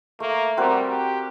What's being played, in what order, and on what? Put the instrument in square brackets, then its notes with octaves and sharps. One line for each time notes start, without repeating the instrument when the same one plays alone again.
[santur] A3 [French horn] A#3
[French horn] G3 [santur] C4 F#4 A#4
[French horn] G4